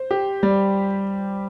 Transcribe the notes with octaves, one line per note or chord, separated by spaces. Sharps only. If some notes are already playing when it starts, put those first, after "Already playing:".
Already playing: C5
G4
G3